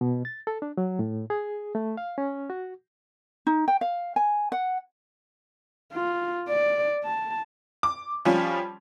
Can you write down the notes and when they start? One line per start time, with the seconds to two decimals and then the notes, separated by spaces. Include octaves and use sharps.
0.01 B2
0.25 A6
0.47 A4
0.62 D4
0.77 F#3
0.99 A2
1.30 G#4
1.75 A3
1.97 F5
2.18 C#4
2.50 F#4
3.47 D#4
3.68 G5
3.81 F5
4.16 G#5
4.52 F#5
5.92 F4
6.48 D5
7.04 A5
7.83 D6
8.25 F3 G3 C#4 F4